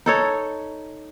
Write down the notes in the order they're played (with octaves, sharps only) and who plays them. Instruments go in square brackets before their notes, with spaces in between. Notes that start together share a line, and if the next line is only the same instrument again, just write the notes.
[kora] D#4 A4 C#5